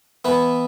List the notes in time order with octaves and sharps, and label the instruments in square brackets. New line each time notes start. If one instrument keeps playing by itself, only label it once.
[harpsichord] E3 B3 E4 B4